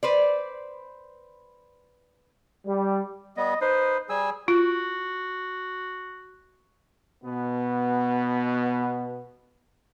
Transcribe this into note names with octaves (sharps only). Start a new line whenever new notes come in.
B4 C5 D5
G3
G3 B3 D#5
D#4 B4 C5
G3 G#4 G#5 E6
F4 F#4
B2 B3